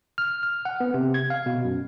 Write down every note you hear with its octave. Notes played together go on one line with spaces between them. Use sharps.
F6
F6
F#5
B3
C3
G#6
F5
B2
F#2